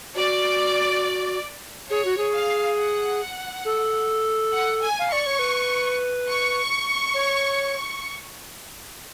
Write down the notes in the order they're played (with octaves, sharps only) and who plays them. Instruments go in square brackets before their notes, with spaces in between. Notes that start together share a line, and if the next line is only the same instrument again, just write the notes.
[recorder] F#4 [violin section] D5
[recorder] G#4 [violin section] C#5
[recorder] F#4
G#4
[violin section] F5
F#5
[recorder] A4
[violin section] F#5
G#5
[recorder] F5
[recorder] D5 [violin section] C#6
[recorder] C#5
B4
[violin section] C#6
[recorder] C#5